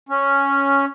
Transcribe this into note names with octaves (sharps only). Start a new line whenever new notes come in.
C#4